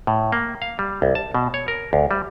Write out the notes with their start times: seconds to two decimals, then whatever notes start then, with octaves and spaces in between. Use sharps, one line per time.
0.07 A2
0.32 A#3
0.62 F5
0.79 G3
1.02 C2
1.15 A5
1.35 B2
1.54 C#5
1.68 A#4
1.93 D2
2.11 G3